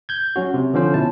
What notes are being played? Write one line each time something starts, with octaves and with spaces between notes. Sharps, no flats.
G6 G#6
F#3 C#4 F#4
C3
D3 F3 C#4 C5
B2 E4 A5